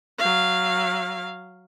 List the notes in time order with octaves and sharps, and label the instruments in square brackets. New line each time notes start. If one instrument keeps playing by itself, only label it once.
[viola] F#3 F5